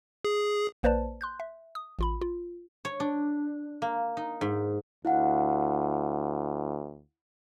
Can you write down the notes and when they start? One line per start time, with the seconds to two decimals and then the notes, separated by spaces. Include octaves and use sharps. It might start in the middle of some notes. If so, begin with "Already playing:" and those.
0.25 G#4
0.83 A#1 A#3 B4 C5 D5 A5
1.21 C6 F#6 G6
1.40 E5
1.75 D#6
1.99 A1 F4 B5
2.21 F4
2.85 C#5
3.00 D4
3.82 A#3
4.17 D#4
4.41 G#2
5.05 D2 E4 F5 F#5